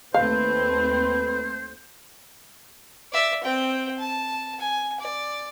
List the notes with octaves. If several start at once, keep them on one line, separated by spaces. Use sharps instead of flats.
D#2 A3 C4 B4 C5 F5
D5 E5
C4 G5
A5
G#5
D5